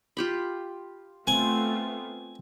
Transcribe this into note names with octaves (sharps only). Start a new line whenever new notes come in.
F4 G4 B5
A3 B3 C4 F4 G#5